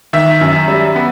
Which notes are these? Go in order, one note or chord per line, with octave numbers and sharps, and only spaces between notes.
D#3 E5
F#2
G3
B3